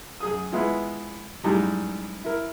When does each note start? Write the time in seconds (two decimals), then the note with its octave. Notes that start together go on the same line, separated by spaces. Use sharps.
0.20 F#2 G#4 D#6
0.52 G#3 B3 E4 F4
1.44 F#2 A2 G3 G#3 D#4
2.24 E4 A#4